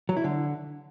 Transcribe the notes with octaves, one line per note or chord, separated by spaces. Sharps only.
F#3
E4
D3